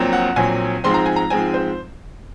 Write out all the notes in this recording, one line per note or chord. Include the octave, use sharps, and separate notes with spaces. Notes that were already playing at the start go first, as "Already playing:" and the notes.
Already playing: A#1 A#2 F#3 C4
F#5
A#1 A#2 F#3 C4 G#5
G#2 F3 G#3 C4 C6
A#5
G#5
A#5
G#2 F3 G#3 C4 G#5
C5